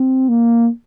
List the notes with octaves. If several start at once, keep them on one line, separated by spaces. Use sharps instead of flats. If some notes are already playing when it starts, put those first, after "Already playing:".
Already playing: C4
A#3